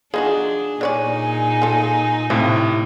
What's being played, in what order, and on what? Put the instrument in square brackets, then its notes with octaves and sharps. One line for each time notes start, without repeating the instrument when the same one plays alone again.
[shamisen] F3 D#4 F#4 [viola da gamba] D4 [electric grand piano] G#4
[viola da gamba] A#2 D#4 [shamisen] D4 C#5 D5 [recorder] G#5
[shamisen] F4 A4
[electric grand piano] A2 C3 [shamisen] F3